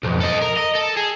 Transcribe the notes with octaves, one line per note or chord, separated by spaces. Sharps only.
B1 F2
A4 D#5
A#4
D#5
A4
G#4